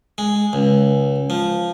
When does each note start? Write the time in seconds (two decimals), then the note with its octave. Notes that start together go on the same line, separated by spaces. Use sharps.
0.18 G#3
0.53 C#2
1.30 F3